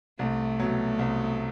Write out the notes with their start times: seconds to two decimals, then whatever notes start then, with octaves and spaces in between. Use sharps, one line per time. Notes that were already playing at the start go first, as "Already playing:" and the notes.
0.19 C2 A3
0.59 B2 F#3
0.99 C2